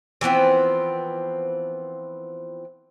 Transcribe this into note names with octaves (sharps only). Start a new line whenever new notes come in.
E3 F3 B3 C4